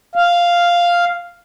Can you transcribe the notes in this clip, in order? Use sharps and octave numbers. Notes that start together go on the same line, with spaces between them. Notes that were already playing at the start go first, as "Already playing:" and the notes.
F5